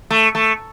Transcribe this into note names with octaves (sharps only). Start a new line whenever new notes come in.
A3
A3